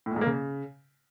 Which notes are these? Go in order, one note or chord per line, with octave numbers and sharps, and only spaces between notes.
A2
A#2
G#2
A#3
C#3